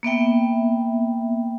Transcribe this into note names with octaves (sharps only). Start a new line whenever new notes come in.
A#3 B3 E5 G5